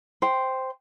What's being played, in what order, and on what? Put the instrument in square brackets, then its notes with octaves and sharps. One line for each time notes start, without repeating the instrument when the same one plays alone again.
[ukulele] C5 G5